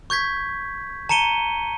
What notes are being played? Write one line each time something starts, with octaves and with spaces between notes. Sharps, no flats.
C#6 G6 G#6 B6
A5 A#5 C#7 D#7 G7